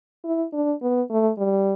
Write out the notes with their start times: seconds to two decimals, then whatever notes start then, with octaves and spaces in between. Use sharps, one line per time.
0.24 E4
0.53 D4
0.82 B3
1.10 A3
1.38 G3